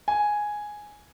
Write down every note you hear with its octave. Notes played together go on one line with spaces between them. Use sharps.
G#5